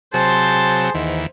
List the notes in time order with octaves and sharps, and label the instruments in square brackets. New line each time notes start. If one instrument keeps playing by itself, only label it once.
[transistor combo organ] C3 F#3 [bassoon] G#4 [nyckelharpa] C5 [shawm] A5
[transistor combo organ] D#2 E3 [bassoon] G#2